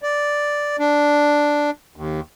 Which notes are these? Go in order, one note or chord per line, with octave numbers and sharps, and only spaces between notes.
D5
D4
D#2